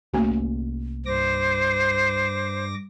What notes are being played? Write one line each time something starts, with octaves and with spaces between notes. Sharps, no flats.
C2 A3 A#3 C#4 F#4
G2 C5 D6 A#6